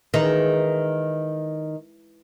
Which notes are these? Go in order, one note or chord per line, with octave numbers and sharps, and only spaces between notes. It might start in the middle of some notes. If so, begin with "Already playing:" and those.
D#3 E3 G#3 D#4